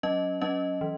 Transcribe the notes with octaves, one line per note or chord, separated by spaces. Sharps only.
F#3 C#4 D#5
F#3 C#4 D#5
E3